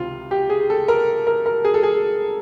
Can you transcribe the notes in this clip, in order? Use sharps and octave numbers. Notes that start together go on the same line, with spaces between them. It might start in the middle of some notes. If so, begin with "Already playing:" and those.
Already playing: C#2 C3 D#3 F4
G4
G#4
A4
A#4
A#4
A#4
G#4
A4
G#4